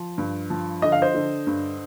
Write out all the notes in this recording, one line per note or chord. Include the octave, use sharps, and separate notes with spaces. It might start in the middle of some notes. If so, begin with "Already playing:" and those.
Already playing: F3
G2
F3
D3 D#5
F5
C5 D#5
D3
G2